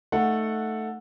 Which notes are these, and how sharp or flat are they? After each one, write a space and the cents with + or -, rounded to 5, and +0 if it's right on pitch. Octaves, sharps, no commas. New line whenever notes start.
A3 +0 D#4 +0 F#5 -10